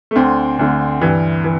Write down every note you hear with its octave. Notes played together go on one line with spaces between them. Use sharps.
A3
D2 D3 C4
D2 D3
G2 E3
E3